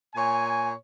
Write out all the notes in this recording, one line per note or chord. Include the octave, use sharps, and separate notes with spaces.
A#2 C#5 G#5